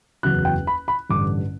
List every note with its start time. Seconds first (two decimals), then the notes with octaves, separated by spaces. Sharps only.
0.23 F#1 E2 C#3 F#3 F#6
0.45 G5
0.67 B5
0.88 B5
1.09 A1 G2 D3 D6